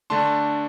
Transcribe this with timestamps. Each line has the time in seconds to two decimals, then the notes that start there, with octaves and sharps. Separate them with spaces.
0.10 D3 A3 D4 A5 C6